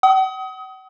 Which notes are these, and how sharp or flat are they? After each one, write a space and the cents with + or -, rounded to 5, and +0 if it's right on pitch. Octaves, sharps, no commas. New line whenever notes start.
F#5 +45 D#6 +30